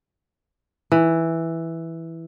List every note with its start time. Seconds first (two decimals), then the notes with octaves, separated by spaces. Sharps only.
0.92 E3